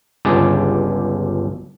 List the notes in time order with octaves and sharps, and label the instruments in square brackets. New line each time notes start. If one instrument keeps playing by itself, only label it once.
[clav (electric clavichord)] G1 C#2 D3 G4 G#4 A5